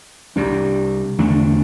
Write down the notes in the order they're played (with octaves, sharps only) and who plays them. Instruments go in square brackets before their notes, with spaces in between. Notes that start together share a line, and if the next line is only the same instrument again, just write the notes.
[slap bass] C2 C3 G3 D4
E2 D3 A3 D4